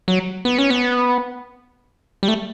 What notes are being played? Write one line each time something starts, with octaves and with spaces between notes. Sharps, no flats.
F#3
B3
C#4
B3
G3
A3